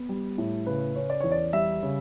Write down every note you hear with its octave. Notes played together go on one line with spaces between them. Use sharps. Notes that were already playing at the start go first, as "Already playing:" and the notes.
Already playing: B3
G3
A2
C#3 B4
C#4
D5
E2 C#5
D5
G3 E5
C#3